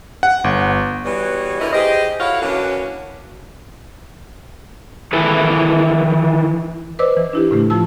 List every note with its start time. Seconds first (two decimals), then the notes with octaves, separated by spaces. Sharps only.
0.23 F#5
0.44 G1
1.05 E3 G3 B3 F#4 C#5
1.60 D3 E4 F#4 A#4 B4 D#5
1.73 G4 G#4 C5 D#5
2.20 E4 F#4 A4 C#5 F5 F#5
2.42 E3 A#3 C#4 D4 F#4
5.13 D#3 E3 E4 G#4 A4 B4
6.99 B4 C5 D5 D#5 D6 E6
7.17 E3
7.33 D4 E4 G4
7.51 A2 C#3 A3
7.70 F3 F4 A5 E6